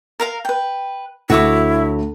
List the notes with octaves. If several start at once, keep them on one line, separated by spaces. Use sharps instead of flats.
A#4 F5 A#5
B4 G5
D2 E4 F#4 C#5 D6